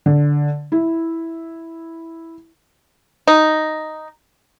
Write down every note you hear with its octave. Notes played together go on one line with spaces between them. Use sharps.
D3
E4
D#4